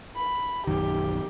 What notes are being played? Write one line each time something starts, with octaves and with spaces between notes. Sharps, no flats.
B5
A#1 F#2 D#3 G4